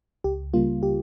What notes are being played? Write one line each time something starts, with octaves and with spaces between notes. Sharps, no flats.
C#2 G4
C#3 G3 A#3 F4
G4